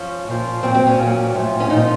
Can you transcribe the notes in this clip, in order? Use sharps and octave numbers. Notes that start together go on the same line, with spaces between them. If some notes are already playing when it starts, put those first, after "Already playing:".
Already playing: F3 C#4
A#2 F3
A#2 F#3 C4
C4
C#4
A#2 F#3
A2 F3
C#4
A#2 F3 D#4